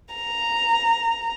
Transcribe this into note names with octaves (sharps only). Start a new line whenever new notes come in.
A#5